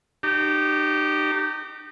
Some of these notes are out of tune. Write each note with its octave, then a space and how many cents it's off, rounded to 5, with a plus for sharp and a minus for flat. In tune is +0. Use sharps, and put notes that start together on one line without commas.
D#4 -35 G4 -20